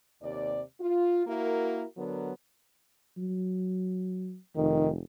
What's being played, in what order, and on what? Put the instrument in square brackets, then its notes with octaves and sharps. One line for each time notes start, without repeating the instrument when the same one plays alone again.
[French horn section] D#2 C3 D5
F4
A#3 E4 F#4 A#4
D3 F#3 B3 A#4
[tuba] F#3
[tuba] F1 [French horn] D#3